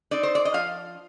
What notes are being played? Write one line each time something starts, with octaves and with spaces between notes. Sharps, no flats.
C4 D#4 D5
C5
D5
D#5
F3 F5